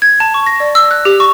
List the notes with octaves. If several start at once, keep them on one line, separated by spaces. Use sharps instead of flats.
G#6
A5
C#6
A#6
D5
E6
F#6
G4
C#6